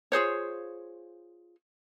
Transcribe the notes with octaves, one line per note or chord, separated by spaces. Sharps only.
F4 G#4 C5 C#5